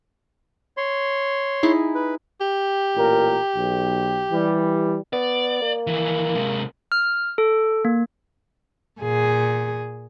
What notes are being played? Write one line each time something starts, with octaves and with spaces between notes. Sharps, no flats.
C#5 C6
D#4 E4 G#4
B4
G4
A1 A#2 A#4
B1
E3 G3
B3 D5
A#3
D#3 E3
C3 G#3
F6
A4
A#3
A#2 G#4